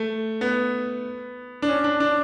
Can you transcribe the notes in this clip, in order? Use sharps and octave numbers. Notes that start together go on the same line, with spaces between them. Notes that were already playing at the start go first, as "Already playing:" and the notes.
Already playing: A3
B3
D4
C#4
D4
D4